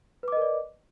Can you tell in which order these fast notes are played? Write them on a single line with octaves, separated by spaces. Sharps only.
B4 D6 D#5 A#4 D5